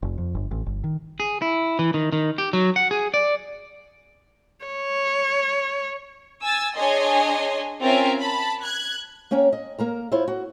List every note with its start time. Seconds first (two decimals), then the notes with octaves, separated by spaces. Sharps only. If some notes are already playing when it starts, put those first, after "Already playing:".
0.02 F1
0.18 F2
0.35 G1
0.51 A1
0.66 G1
0.84 D#3
1.20 G#4
1.42 E4
1.79 E3
1.94 D#3
2.12 D#3
2.38 G4
2.53 F#3
2.76 F#5
2.91 G#4
3.14 D5
4.66 C#5
6.42 G#5 E6 A6
6.75 D4 G#4 C#5 D#5 G#5 C6
7.80 C4 C#4 F4 A#4 E5 G#5
8.19 A5 B5
8.62 F#6 G#6
9.31 A#3 C#4 C#5 G5 A#5
9.53 D#5
9.79 A#3 A#4 A#5
10.12 E4 F4 C5 C#5
10.28 F#4